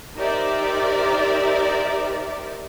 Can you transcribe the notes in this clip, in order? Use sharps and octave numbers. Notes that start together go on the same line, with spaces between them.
D#4 G4 A#4 C5 D5 E5